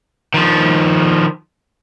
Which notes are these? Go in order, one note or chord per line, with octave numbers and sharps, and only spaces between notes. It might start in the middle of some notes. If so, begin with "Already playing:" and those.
D#3 F3